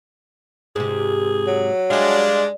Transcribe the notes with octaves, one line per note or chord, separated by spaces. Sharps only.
G#2 C3 G#4
F#3
G3 G#3 D4 F5